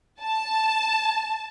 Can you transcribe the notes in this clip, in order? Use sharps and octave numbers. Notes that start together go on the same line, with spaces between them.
A5